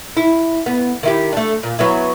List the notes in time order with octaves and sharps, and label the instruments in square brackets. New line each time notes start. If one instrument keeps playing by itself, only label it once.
[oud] E4
B3
D#3 E4 G4
A3 D4
A#2
F#3 B3 E4